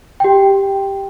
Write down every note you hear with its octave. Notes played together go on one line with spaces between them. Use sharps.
G4 G5